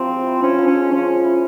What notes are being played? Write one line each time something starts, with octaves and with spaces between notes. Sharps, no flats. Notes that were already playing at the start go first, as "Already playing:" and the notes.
Already playing: F3 C4 E4 G4 A#4
G#3
E4
F3 C#4
F3
C#4
G#3
F3 C#4
G#3
E4